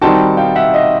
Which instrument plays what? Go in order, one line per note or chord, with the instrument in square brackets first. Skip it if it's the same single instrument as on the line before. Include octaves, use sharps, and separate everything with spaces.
[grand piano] D#3 G3 C4 D#4 F#4 [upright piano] G5 A5
[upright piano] F5 G5
E5 F#5
D#5 F5